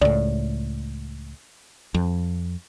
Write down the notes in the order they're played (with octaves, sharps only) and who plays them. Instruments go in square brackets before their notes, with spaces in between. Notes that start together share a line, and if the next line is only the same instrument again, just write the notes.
[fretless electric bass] C#2 A2 [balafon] D5
[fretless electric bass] F2